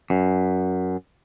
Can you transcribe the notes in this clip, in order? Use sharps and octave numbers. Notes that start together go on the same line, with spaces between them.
F#2